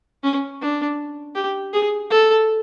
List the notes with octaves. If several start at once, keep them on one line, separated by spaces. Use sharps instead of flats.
C#4
D4
G4
G#4
A4